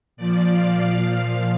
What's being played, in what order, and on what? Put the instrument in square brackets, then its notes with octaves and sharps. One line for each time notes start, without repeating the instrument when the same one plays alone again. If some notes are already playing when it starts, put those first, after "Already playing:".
[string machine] A#2 F3 D5
F5
A#2 F3